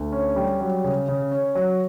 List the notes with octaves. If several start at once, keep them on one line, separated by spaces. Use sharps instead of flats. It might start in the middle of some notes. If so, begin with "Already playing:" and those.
Already playing: D2
C#4
G3
F#3
C#3
C#3
C#4
F#3